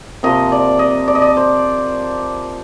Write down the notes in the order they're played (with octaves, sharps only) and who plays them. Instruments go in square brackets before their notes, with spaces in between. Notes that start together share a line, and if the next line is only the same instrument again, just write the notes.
[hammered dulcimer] C3 F3 A#3 D#5
D5
D#5
D5
D#5
D5
C5